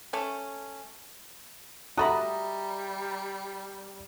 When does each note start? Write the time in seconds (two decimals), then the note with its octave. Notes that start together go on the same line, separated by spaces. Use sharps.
0.13 A3 C#4
1.97 G3 F#4 A4 D#5 E5 A#5 B5